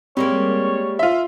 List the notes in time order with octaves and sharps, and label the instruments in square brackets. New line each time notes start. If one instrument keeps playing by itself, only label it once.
[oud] G3 G#3 A#3 [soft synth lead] C4 [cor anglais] C#5
[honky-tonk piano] F4 E5 [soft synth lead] C6